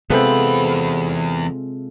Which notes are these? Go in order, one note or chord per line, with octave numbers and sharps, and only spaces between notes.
E2 C3 G#3 B3 C4 F4 A4 B5